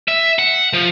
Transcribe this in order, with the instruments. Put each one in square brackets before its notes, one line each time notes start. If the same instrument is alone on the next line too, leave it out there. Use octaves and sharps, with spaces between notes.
[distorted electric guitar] E5
F#5
F3